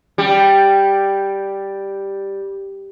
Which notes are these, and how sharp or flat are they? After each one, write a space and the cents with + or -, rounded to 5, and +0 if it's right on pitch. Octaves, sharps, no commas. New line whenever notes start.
G3 +0 G4 +0